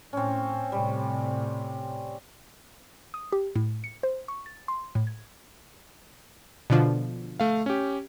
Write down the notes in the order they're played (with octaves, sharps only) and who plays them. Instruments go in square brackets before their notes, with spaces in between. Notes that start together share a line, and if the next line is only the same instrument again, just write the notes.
[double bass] A2 [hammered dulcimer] C4 C#4
[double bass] A2 C3 [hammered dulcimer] G3
[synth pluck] D#6
G4
A2
C#7
C5
C#6
A6
C6
A2
G#6
[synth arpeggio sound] B2 D3 F3
[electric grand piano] A3 F5
C#4 G4